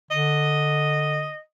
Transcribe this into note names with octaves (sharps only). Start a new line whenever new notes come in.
D3 D#5